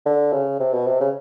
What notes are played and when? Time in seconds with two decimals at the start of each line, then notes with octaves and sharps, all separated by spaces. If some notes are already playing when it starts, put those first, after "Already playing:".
0.06 D3
0.33 C#3
0.60 C3
0.73 B2
0.87 C3
1.01 C#3